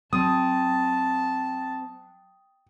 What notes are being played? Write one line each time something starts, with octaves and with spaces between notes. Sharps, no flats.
F#3 C4 A5 D#6